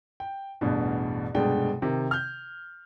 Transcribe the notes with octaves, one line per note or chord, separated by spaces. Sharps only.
G5
A1 E2 G2 B2
F1 G2 B2 G#3 D4 G5
C3 D#3
F6 G6